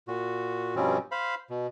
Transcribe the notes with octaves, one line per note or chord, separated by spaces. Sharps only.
A#2 F#4
G2 B2 F3 G3 C4 C#4
C5 F5 B5
B2